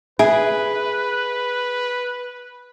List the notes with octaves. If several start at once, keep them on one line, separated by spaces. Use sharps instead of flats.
G#4 B4 E5